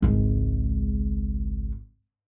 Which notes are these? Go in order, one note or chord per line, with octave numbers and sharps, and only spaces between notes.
G#1 C#2